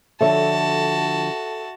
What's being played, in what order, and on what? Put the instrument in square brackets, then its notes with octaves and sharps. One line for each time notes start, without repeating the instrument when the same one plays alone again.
[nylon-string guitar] D3 F3 C#5 [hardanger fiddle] F#4 A5 [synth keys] A4 [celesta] E5